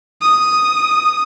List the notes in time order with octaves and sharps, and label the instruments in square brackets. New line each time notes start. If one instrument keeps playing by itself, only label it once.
[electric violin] D#6